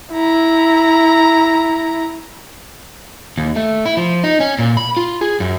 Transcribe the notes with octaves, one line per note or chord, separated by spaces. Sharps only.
E4 A#5
D#2
A3
E4
F3
D#4
C#4
A#2
B5
F4
G#4
F#2